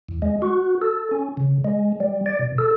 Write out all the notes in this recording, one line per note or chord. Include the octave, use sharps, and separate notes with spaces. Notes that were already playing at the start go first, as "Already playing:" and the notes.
E2
G#3
F#4
A4
C#4
C#3
G#3
G3
D5
B2
A4